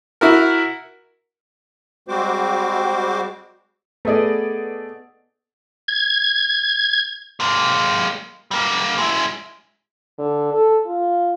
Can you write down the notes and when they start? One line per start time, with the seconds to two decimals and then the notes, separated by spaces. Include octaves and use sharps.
0.21 E4 F#4 A#4
2.08 G3 G#3 C4 F#4 C5 D6
4.05 A3 B3 G#4 D5 D#5
5.88 G#6
7.40 G#3 A#3
8.51 G3 A#3
8.98 G#3 E4
10.18 D3
10.53 A4
10.86 F4